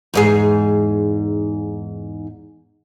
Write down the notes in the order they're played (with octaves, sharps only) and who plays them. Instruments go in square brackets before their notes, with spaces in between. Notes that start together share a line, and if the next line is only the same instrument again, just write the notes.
[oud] E2 G#2 G#4